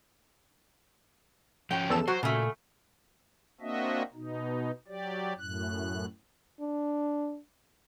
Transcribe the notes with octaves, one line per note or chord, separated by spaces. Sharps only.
F3 C#4 F#4 G5
E2 A4 E7
F#3 F#4 C5
A#2 C#3 A3
A#3 C4 D4 F#4 D#5 E5
B2 D#4
F#3 G4 D5
F#2 A2 F#6
D4